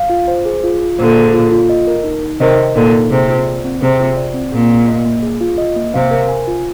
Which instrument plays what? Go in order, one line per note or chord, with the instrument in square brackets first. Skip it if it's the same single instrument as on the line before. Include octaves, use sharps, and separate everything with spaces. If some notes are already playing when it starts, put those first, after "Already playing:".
Already playing: [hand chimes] F5
F4
C5
G#4
F4
F4
[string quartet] A#2 D3 [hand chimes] C5
[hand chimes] G#4
F4
F4
D#5
A#4
D#4
D#4
[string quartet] C3 D#3 [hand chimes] D#5
[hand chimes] A#4
[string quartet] A#2 D3 [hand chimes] D#4
[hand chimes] D#4
[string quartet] C3 [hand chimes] G#4
[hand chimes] F4
D5
C4
[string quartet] C3 [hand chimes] G#4
[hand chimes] F4
D5
C4
[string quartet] A#2 [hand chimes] G#4
[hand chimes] F4
D#5
A#3
G#4
F4
D#5
A#3
[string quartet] C3 [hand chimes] F5
[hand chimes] A#4
G#5
F4